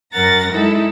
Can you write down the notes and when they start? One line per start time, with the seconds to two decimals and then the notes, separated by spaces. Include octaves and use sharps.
0.11 F#2 A#4 F#5 A6 A#6
0.52 G#3 D#4 E4 A4